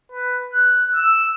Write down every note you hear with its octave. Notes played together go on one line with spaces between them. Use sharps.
B4
F#6
E6